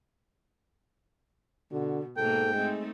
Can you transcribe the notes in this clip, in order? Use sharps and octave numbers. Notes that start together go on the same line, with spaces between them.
B2 D3 F#4
G#2 B2 A#3 A4 G5
G#3 A3 C4 D#4